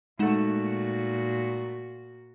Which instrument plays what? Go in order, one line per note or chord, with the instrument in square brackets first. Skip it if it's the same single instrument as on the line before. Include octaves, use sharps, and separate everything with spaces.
[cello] A#2 F#4 [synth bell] G#3 D#4 E7 [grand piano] A3 F#5